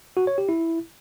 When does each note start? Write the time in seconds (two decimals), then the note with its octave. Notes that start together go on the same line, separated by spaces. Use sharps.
0.17 F#4
0.27 C#5
0.38 G4
0.49 E4